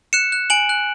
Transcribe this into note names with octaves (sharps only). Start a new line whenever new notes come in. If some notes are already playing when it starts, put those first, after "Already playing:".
F#6 C#7 E7
F#6
G#5 D7 F#7
F#6